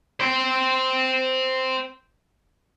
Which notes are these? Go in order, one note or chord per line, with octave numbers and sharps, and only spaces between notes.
C5 G5